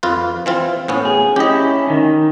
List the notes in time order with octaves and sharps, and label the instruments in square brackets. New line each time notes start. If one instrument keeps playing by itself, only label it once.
[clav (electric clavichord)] F2 F4 B4
E3 C4 F4
A2 B3 C#4
[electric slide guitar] G#4
[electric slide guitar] C#4 E4 [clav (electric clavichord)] G4 D#5
[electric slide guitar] D#3 D#4